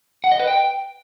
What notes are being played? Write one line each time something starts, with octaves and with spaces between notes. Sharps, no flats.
F#5
D#5
B4
G5